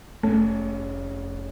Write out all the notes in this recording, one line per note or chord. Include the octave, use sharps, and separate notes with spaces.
F1 A3 C#4